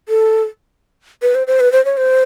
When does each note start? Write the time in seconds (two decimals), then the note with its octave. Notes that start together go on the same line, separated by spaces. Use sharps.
0.09 A4
1.22 B4
1.35 C5
1.47 C5
1.60 B4
1.72 C5
1.85 C#5
1.97 C5